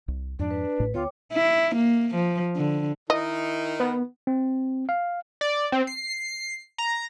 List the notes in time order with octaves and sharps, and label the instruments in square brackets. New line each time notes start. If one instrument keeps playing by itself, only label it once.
[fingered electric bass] C2
[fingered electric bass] F2 G#2 F3 [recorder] D4
[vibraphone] B4
[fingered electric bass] A1 A2
[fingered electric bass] D2 B3 [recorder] F4 [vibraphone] C#5 G5 D6
[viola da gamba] E4
A#3
F3
D3
[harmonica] D#3 D#4 A#4 [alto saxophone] E4 [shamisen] D#5
[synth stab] B3
[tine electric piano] C4
F5
[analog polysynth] D5
C4
C7
A#5